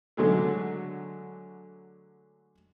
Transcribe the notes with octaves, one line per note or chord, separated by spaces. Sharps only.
D3 F#3 G#3 A3